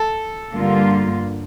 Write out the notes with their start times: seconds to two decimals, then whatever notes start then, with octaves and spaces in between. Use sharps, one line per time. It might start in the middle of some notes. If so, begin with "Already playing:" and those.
Already playing: A4
0.55 G2 D3 G3 A#3 F4